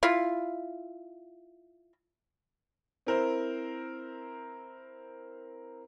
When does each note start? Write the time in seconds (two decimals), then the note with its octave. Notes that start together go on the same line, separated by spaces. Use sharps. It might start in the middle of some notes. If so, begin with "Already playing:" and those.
0.03 E4 F4
3.07 C4 E4 A#4 C5